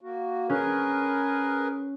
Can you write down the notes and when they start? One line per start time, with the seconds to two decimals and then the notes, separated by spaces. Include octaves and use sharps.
0.01 A#3 F#4
0.50 C#4 G#4 A#4 B4